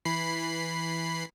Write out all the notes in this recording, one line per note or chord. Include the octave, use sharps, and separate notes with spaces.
E3 B5 C7